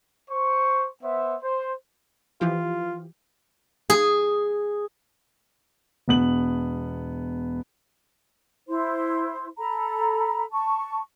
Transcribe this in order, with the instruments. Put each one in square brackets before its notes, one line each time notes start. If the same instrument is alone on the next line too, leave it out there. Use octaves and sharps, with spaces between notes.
[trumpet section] C5 C#6
B3 C5 E5
C5
[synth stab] E3 F3 G4 [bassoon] F4
[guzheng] G#4
[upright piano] E1 B3 F#7
[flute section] E4 C5 C6
A4 A#5 B5
A5 C#6